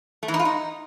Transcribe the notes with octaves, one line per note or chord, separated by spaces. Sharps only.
A3
E3
D#4
F4
D#4